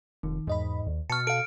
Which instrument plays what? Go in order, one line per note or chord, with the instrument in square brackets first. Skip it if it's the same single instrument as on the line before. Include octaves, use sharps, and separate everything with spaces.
[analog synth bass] F1 [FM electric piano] D#3
[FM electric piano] E2 D#5 B5 [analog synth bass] G#2
[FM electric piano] D#2
[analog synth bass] B2 [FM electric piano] A5 C#6 [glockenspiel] F6 C#7
[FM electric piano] A4 F5 [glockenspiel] D7